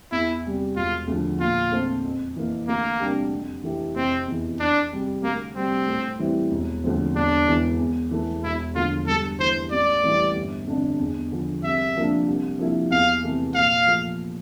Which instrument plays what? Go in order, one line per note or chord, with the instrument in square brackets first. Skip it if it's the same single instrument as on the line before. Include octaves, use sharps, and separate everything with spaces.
[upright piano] E2 [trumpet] E4
[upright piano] C3 G3
[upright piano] E1 [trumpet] F4
[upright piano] D2 D3 F3
[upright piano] A#2 [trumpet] F4
[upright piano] A3 C4
F2
E3 A#3
[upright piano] D2 [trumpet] A#3
[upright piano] C3 G3 D4 G4
F2
E3 A3 E4 G4
[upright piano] F1 [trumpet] C4
[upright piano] E2 E3
[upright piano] F2 [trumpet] D4
[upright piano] C3 G3
[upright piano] D2 [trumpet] A#3
[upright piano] C3 G3 [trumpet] C4
[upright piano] A2
E3 G3 C4 E4
E1
D2 D3 F3 C4
[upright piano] E1 [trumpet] D4
[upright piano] E2 E3
E2
E3 A3 E4
[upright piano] E1 [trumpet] E4
[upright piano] D2 D3 F3 [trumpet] F4
[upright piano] G2 [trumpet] A4
[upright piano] E3 A3 [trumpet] C5
[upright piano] A1 [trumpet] D5
[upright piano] A2 E3 G3
G1
F2 D3 A3 D4
E2
D3 F3
[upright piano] C2 [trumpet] E5
[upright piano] C3 F3 A#3 D4
C2
C3 F3 A#3 E4
[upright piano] E2 [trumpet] F5
[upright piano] C3 E3 A3
[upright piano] A#2 [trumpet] F5
[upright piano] F3 A3